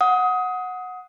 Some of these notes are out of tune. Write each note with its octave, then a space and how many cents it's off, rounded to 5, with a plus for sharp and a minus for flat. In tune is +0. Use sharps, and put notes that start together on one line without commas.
F#5 -10 D#6 +20